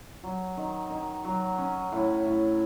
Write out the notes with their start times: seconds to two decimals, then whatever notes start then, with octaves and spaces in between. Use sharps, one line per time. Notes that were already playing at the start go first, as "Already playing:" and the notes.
0.23 F#3
0.57 D#3
0.90 D#3
1.24 F#3
1.58 C#4
1.92 A2
2.26 A2